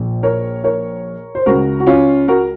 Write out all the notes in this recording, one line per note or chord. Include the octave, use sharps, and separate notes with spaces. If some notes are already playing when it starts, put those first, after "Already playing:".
Already playing: A#1 A#2
A#4 C#5
A#4 C#5
C5
C#2 C#3 F#4 A#4
F#4
C#4 F4
F#4 A#4